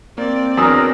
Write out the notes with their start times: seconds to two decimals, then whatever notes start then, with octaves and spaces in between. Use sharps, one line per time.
0.18 A#3 C4 D5
0.57 E2 F#3 D4 G#4 A#4 D#6 E6